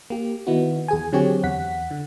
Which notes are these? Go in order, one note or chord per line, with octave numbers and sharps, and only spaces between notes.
A#3 G4
D#3 B3 D#4 E4 F#4
E2 G#4 G#5
D3 F#3 C4 G4 G#4 C#5
E2 F#5 B6
D3